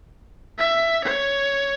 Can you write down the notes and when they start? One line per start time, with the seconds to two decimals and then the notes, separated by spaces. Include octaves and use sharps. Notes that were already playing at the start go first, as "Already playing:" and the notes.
0.59 E5
1.04 C#5